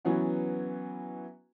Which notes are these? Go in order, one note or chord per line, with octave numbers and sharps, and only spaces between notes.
E3 F#3 B3 C#4 F#4